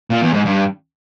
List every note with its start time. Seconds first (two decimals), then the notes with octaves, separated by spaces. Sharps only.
0.10 A#2
0.22 E2
0.33 G#2
0.45 G2